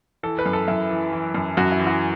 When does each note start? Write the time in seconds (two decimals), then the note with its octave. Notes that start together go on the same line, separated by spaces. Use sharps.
0.23 E3 A4
0.39 B4
0.46 F#2
0.53 A4
0.68 F#2 E4
0.90 E3
1.12 E3
1.35 F#2
1.57 F#2 F#4
1.72 E4
1.79 E3
1.87 F#4